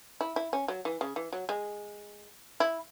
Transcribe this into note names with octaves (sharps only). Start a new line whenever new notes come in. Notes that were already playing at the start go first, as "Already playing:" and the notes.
E4
E4
C#4
F#3
E3
C#3
E3
F#3
G#3
E4